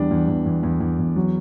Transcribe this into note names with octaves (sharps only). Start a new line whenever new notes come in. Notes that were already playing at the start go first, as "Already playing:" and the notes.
Already playing: E2 G3 D4
E2
E2
E2
E2
E2
E2
F#3